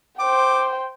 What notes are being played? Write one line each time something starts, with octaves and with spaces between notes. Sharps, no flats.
C5 G5 D6